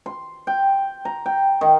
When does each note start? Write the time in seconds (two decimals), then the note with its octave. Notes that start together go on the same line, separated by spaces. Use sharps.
0.06 C6
0.47 G5
1.05 A#5
1.26 G5
1.61 D#3